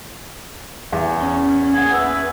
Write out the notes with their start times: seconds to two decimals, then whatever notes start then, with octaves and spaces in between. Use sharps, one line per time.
0.92 E2
1.22 C#4
1.73 A#3 G#4 F#5
1.93 B4 E5